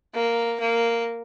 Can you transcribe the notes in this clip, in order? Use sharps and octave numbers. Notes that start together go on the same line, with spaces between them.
A#3
A#3